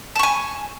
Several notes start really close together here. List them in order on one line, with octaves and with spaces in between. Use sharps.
A5 C#6 G#5